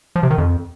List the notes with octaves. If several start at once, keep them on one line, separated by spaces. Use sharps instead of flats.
F3
C3
D#3
F2